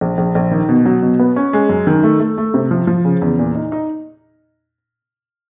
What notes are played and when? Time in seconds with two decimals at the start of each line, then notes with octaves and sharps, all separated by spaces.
0.01 A#1
0.18 A#1
0.35 A#1
0.51 D#3
0.69 B2
0.85 F#3
1.02 B2
1.19 B3
1.36 C#4
1.53 G#3
1.69 F#2
1.87 D#3
2.03 A3
2.20 A3
2.38 A3
2.54 C3
2.71 F3
2.87 F3
3.05 C#3
3.22 E2
3.39 A#2
3.55 D#4
3.72 D#4